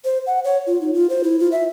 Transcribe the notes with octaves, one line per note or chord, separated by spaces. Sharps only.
C5
F#5
C#5
F4
D#4
F4
C5
E4
F4
E5